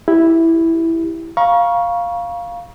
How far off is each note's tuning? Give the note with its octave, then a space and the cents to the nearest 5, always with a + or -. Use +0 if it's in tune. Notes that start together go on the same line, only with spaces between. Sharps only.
E4 +0 G4 +0
F5 +0 A#5 +40 C#6 +0